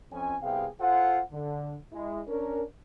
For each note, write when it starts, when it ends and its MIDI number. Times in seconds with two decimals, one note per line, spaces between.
0.12 0.36 41
0.12 0.36 61
0.12 0.36 80
0.42 0.67 36
0.42 0.67 48
0.42 0.67 59
0.42 0.67 68
0.42 0.67 77
0.42 0.67 79
0.81 1.20 65
0.81 1.20 69
0.81 1.20 72
0.81 1.20 78
1.32 1.75 50
1.92 2.21 56
1.92 2.21 64
2.28 2.63 61
2.28 2.63 62
2.28 2.63 70